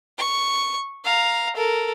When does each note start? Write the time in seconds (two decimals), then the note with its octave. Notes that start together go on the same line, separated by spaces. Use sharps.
0.18 C#6
1.05 F5 A#5
1.56 A4 A#4